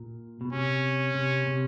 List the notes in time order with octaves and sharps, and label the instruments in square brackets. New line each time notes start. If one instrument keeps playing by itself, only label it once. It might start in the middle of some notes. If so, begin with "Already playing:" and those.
Already playing: [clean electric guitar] A#2
B2
[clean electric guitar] C3 [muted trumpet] C#4
[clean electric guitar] C3
C3